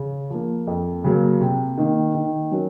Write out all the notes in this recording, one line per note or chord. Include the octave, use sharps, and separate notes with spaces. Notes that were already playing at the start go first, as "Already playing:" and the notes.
Already playing: C#3
F3 A#3
F2
C#3 F#3 A#3
C3
D#3 A#3
D#3
F#3 C#4 F#4 A#4